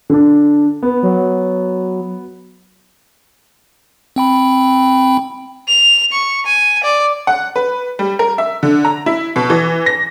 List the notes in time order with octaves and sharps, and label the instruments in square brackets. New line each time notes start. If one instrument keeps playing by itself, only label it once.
[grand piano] D3 D4
B3
[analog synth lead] F#3
[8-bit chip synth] C4 G5 B5
[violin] F7
C#6
G#5
D5
[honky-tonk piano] F#5
B4
G3
A#4
E5
D3
A#5
E4
B2
E3
A#6